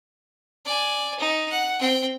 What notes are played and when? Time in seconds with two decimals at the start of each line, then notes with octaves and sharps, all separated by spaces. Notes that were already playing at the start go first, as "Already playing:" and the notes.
0.66 D5 G#5
1.19 D#4
1.51 F#5
1.80 C4 G5